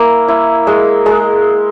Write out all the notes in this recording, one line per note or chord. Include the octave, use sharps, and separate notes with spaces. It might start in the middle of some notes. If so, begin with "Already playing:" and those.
Already playing: A#3 E4
E4
G#3
G#3